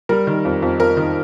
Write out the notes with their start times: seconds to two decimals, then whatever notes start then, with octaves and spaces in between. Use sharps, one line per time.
0.09 G3 A#4
0.27 D#3
0.45 F2
0.62 F2
0.80 F2 A#4
0.97 D#3